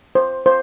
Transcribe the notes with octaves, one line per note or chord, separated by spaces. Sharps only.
C5
C5